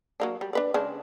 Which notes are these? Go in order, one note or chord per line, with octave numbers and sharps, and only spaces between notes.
F#3 A#3 D4
G3
D4 B4 D5
C#3 G#3 D4